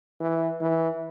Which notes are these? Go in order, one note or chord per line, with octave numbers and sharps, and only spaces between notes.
E3
E3